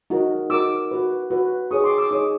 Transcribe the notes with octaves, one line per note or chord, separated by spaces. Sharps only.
D#4 F#4 A#4
D#4 F#4 A#4 D6 E6
F#4 B4
F#4 B4
D#4 G#4 C#5 C#6 D#6
C6 D6
D6 E6
D#4 G#4 C#5 C#6 D#6